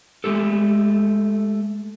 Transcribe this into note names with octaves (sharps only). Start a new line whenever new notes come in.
G#3 A3 G4 A4